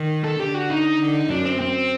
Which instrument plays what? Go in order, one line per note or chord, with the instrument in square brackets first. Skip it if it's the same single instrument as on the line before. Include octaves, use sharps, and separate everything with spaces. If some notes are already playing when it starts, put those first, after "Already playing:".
Already playing: [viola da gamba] D#3
[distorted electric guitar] A4
[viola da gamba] D3 [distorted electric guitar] G4
[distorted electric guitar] F#4
D#4
[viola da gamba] D3
[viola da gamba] F#2 [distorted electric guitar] D4
[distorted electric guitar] C4
C4